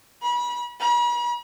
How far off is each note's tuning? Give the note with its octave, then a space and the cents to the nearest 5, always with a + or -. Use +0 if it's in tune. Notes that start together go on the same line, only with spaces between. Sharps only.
B5 -35
B5 -45